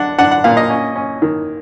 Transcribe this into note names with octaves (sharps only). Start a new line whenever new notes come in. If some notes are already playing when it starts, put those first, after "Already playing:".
Already playing: D4 F#5
D4 F#5
F#5
A#2 F5
D#5
C#4
C#4
D#3